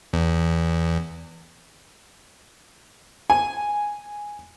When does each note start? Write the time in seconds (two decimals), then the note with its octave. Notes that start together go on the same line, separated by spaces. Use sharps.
0.13 E2
3.30 G#5